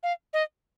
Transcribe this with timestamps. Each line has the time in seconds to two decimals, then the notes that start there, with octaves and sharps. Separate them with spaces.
0.03 F5
0.33 D#5